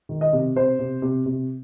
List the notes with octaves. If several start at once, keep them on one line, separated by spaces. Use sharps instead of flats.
D#3
D#5
C3
C3 C5
C3
C3
C3